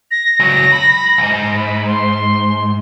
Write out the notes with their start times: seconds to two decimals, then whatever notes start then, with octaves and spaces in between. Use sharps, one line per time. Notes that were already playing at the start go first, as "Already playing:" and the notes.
0.11 A#6
0.40 C#2 F#3
0.72 B5
1.18 B1 G#2
1.55 B5
1.87 C6